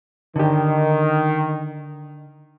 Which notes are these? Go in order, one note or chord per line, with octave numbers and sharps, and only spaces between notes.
D3 D#3 G4